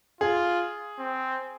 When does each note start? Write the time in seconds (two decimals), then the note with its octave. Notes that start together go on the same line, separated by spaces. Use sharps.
0.21 F4 G#4
0.99 C4